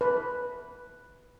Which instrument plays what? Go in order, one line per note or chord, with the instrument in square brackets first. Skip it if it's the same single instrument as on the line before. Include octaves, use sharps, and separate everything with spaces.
[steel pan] B4